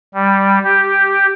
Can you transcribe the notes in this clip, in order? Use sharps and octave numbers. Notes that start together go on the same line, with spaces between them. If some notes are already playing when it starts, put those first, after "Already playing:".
G3
G4